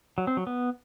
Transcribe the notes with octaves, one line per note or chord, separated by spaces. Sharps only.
F#3
C4
F#3
B3